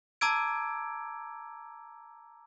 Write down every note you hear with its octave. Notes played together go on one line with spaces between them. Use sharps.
A5 A#5 D6 E6 G#6 D7